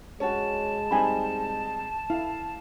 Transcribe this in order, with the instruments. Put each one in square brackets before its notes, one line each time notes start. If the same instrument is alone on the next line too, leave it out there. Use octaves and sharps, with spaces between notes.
[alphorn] G#3 [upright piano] C#4 F#4 [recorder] A5
[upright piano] G3 C4 D#4 [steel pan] G#5 B5
[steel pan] E4 [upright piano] F5